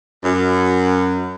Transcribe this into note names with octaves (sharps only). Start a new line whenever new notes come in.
F#2